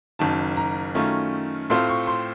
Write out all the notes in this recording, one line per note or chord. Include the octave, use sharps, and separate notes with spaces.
F#1 F#2 D#3 A5
A#5
F#2 D#3 A3 C#4 F4
A2 A3 C4 F4 C6
C#6
C6